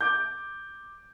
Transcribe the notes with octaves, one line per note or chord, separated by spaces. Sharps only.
D6 G6